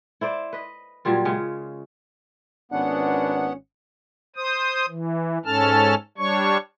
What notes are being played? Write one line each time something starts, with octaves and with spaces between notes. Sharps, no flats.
E4 C5 D5
B4 D#5
A#2 F#3 G3 F4
C#3 G#3 C#4
G#1 B3 C#4 D4 F#5
C5 D#6
E3
G#2 C#4 A4 A5 F6
G3 D4 C#5 C#6